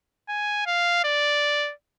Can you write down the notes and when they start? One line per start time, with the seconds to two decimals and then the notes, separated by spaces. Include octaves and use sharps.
0.29 G#5
0.67 F5
1.05 D5